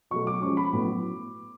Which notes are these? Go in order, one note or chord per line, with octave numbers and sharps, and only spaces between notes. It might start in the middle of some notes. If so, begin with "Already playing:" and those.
B2 F#3 A3 C#6
D6
F3 G#3 C#4 C#6
B5
A2 F#3 B3